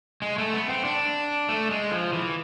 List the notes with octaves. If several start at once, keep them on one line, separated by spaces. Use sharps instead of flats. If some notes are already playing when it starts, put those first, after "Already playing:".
G#3
A3
B3
C4
D4
A3
G#3
F3
E3